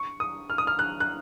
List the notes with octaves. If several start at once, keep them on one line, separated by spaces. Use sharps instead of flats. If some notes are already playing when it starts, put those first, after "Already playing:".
Already playing: C#6
D#6
F6
D#6
F6
F#6
F#6